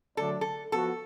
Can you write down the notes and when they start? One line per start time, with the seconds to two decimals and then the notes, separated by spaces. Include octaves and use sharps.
0.17 D3 F#3 A3 D4 A4
0.41 A4
0.72 F3 B3 F#4 A4